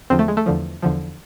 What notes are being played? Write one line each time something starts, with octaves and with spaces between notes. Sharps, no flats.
E2 D3 F3 C4
A3
G#3
A3
E2 D3 F3
E2 D3 F3